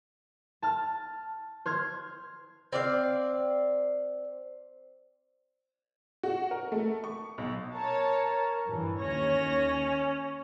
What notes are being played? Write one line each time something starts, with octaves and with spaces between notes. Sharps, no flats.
A5 F6
C5 F6 G#6
C4 D5 F5
F#4
A#4
A3
C#6
B1
A#4 C#5 A5
G2 E3
D#2 C#4 C#5 A#6